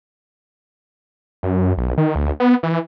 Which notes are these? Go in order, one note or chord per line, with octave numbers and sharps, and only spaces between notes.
F#2
B1
D#3
D2
B3
E3